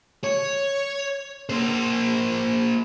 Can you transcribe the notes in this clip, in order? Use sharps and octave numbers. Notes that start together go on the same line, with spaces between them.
C#5
A#3 C5